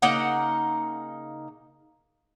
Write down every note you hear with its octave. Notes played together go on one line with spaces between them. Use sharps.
C#3 A#3 D#4 F#5